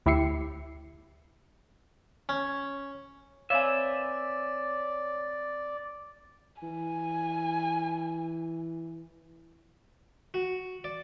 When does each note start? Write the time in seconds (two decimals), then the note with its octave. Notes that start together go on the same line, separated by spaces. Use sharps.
0.06 D2 E4 G4 E5 C7 C#7
2.29 C#4
3.50 C4 B4 C#5 D5 E5 F5 G#5
6.62 E3 G#5
10.34 F#4
10.84 D5